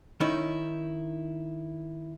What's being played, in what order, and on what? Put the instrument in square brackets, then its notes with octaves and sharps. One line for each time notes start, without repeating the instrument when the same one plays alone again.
[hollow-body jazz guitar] D#3 C#4 D#4 E4